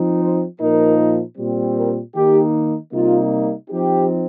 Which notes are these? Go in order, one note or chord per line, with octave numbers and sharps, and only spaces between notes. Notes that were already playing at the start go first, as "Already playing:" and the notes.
Already playing: F3 C4 D#4
C5
A#2 F3 A#3 D#4 A#4
A#2 G3 C4
A#4
D#3 A#3 D#4 G4
C3 G3 A#3 D#4 F4
F3 C4 D#4 G4